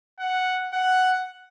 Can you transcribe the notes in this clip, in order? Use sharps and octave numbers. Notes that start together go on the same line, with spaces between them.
F#5
F#5